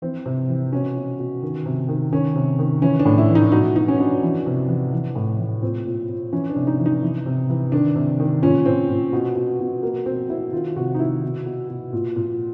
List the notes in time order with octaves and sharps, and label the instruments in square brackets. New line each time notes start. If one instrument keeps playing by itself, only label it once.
[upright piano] E3 C4
C3
E3
B2 C#4
B2
B2
D#3
C3
D#3
D#3 C#4
C3
D#3
E3 C#4
D4
A2
E4
E3
D#4
B2 D#4
B2 D#4
C#4
B2 D4
E3
C3
E3
E3
A2
E3
A#2 C4
A#2
A#2
E3 C#4
D4
C3
D#4
E3
D#4
E3
C3
E3
D#3 D4
C3
D#3
A#2 C#4
A#2 C4
A#2
B2
B2
B2
B2 A#3
B2 C4
B2 E4
D#3 F4
C3 F#4
D#4
D#3 E4
B2
B2
B2
A#2
A#2